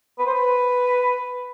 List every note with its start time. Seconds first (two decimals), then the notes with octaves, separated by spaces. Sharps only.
0.19 B4
0.26 C5
0.33 B4